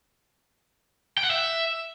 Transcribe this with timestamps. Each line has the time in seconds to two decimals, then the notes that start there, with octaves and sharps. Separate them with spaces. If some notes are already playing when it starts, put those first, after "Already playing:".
1.17 G5
1.24 F#5
1.30 E5